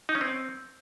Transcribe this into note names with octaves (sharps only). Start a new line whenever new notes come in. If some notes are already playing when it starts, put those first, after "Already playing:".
D#4
C#4
C4